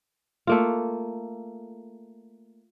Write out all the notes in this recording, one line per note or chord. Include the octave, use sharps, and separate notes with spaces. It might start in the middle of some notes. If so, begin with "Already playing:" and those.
A3 A#3 F4